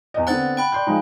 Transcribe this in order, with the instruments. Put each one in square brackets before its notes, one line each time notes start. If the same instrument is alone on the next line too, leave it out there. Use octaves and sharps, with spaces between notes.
[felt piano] E2 D#5
[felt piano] D3 B3 C4 [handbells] F#5 F#6 A6
[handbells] G5 B5 F#6
[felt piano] D5 C6 G6
F3 G#3 D#4